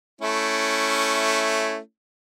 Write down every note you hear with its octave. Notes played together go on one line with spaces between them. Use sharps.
A3 C#4 E4